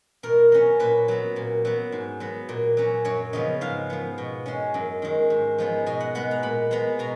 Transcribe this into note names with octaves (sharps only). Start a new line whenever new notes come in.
B2 A#4
F#3 C#4
A#2 B4
F#3 B3
A#2
F#3 B3
G#2
F#3 B3
A#2
F#3 C#4
F#2 C#5
C#3 F3 B3 D#5
G#2 F5
F3 B3
B2
G#3 C#4
F#2
D#3 G#3
G#2
F3 G#3 B3
B2 D#5
F#5
G#3 B3 F#5
A#5
A#2 B5
G#3 B3 A#5
B2 A#5